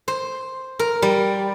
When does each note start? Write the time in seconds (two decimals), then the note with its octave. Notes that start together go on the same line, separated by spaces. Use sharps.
0.08 C5
0.79 A#4
1.02 G3